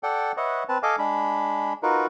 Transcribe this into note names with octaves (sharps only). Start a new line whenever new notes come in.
A4 D5 F#5 G5
B4 C#5 D#5 E5 F#5
C4 B4 A5
A4 D#5 F5 G#5 D6
G#3 D4 B5
D#4 F4 F#4 A#4 B4